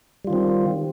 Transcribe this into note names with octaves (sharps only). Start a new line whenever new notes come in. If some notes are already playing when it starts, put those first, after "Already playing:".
D#3 G3 C4 F4